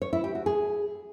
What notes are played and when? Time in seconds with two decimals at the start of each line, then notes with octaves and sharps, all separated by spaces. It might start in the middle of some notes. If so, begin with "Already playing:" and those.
0.02 C#5
0.13 E4
0.24 G4
0.35 F#4
0.46 G#4